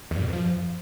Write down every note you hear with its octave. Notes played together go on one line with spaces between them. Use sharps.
E2
G2
B2
F2
F3